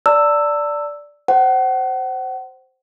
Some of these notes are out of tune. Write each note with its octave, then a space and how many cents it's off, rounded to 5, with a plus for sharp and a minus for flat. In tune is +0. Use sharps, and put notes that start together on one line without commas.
D5 -5 A5 +45 E6 +0
C5 +0 F#5 +35